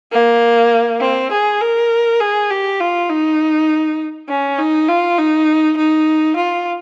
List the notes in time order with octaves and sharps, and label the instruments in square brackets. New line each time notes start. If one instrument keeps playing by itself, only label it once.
[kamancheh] A#3
C4
G#4
A#4
G#4
G4
F4
D#4
C#4
D#4
F4
D#4
D#4
F4